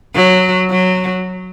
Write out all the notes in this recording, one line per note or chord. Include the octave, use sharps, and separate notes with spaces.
F#3
F#3